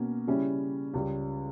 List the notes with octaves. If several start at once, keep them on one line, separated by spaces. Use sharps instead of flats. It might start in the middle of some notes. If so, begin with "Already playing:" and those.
Already playing: B2 A#3 C#4
C#3 G3 C#4 E4
C#2 C#3 G3